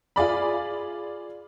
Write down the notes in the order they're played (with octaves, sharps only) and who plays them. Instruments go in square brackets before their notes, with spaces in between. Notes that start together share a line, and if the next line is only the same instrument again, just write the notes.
[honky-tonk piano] F4 G#4 D5 B5